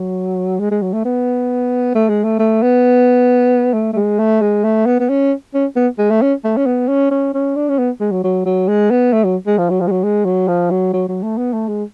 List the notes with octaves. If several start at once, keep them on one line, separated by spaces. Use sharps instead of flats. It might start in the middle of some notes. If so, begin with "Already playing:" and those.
Already playing: F#3
G#3
G#3
F#3
A3
B3
A3
G#3
A3
A3
B3
A3
A3
G#3
A3
G#3
A3
B3
B3
C#4
C#4
B3
G#3
A3
C#4
A3
C#4
B3
C#4
C#4
C#4
D4
C#4
B3
G#3
F#3
F#3
F#3
G#3
B3
A3
F#3
G#3
F3
F#3
F3
G#3
F#3
G#3
F#3
F3
F#3
F#3
F#3
A3
B3
A3
G#3